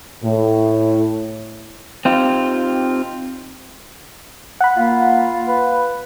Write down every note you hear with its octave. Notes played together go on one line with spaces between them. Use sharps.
A2
C4 D#4 F4 G4
F#5 B5
A#3 F4
B4